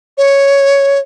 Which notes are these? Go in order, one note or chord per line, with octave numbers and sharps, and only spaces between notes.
C#5